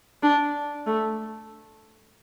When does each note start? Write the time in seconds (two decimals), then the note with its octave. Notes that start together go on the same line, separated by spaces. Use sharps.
0.23 D4
0.86 A3